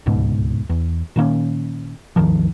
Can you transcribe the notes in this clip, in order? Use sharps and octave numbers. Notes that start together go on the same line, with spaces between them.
D1 C#2 G#2 B2
E2
A#2 D#3 A#3 C#4
G#1 D#2 D#3 F3